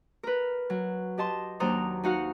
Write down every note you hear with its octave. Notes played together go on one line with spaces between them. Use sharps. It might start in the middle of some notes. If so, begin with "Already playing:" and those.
A#4 B4
F#3
G4 D#5 A5 C6
D#2 F#3 D4 C5 A#5 D#6
D#4 F#4 F5 F#5